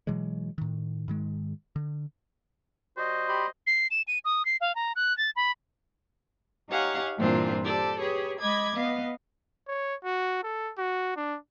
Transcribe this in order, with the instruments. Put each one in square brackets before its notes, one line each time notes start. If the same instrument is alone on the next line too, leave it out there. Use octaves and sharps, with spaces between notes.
[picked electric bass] B2 E3 F#3 G#3
A2 D#3
G#2 D#3 G#3
D3
[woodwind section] G3 F#4 D#5 [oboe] C5
[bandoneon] G4 B5 C6
[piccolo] C7
E7
D#7
D#6
C7
F5
A#5
F#6
A6
B5
[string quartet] D#4 G4 C#5 F5 F#5 G#5
G2 A#2 E3 C4 D4 F4
G4 A4 C5 D5
G4 G#4 B4 C#5
G#3 D#5 B5 D6 G#6
B3 D#5 F5
[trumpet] C#5
F#4
A4
F#4
D4